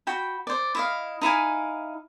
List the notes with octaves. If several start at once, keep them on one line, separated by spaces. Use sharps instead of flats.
F#4 G5 B5
C5 D5
E4 D#5 F5
D#4 E4 F5 G#5